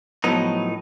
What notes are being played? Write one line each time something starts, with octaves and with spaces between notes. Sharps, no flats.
A2 F3 F#3 B3 D#4